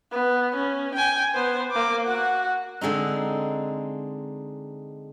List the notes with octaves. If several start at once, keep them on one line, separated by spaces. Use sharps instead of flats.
B3
C#4
G5 G#5
B3 C5
A#3 D6
F#4 F#5
D3 G#3 C4 D#4